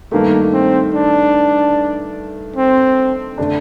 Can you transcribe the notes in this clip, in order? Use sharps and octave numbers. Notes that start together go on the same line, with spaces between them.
G2 D#3 A3 A#3
C4
D4
C4
D3 A3 D4